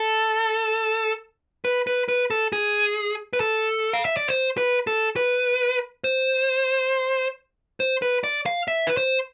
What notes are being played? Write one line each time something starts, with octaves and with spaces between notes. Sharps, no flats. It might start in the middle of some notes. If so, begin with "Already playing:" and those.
Already playing: A4
B4
B4
B4
A4
G#4
B4
A4
F5
E5
D5
C5
B4
A4
B4
C5
C5
B4
D5
F5
E5
B4
C5